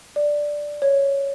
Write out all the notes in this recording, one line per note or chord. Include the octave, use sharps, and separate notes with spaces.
D5
C#5